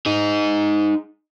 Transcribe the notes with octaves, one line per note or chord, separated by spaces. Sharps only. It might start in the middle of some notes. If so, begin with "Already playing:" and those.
D#4 G#4